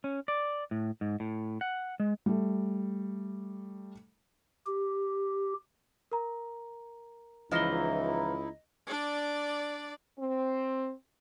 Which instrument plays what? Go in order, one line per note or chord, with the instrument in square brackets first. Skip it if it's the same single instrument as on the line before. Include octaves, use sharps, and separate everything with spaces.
[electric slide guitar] C#4
D5
A2
G#2
A2
F#5
G#3
[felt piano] G3 A3
[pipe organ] G4
[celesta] A#4 A#5
[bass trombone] C#2 [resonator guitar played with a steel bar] E3 F3 [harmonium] D#4 E4 [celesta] D#5 A#6 G7
[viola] D4 D5
[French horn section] C4